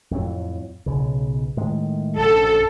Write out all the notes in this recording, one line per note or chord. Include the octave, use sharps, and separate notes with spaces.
F2 A2 F#3
B1 C#3
A2 D#3 G#3
A#1 F#2 A4